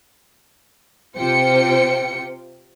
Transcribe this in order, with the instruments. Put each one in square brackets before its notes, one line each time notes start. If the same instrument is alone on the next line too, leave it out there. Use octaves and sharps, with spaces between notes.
[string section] C3 F4 C5 G5 C#7